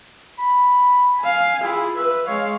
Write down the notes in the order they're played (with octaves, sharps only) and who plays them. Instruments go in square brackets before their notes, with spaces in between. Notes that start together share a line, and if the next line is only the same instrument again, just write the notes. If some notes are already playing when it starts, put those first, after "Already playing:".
[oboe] B5
[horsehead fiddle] F5 G#5
[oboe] E4 [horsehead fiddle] F4 G#4
[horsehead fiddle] B4 [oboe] E5
[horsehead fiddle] G#3 F5 [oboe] C#5